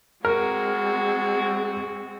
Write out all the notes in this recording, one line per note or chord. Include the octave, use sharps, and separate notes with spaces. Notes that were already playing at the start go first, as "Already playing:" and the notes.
G#3 C4 F#4 A#4